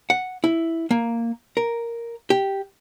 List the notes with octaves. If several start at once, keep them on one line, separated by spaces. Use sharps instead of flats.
F#5
E4
A#3
A#4
G4